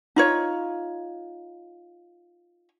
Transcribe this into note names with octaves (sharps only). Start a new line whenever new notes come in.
D#4 F4 C#5